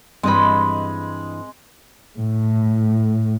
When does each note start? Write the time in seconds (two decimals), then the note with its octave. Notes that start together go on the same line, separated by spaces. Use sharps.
0.23 G2 E3 G#3 C4 D#5 B5
2.17 A2